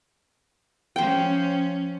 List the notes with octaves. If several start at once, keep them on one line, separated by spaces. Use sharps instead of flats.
F3 C#4 C5 G5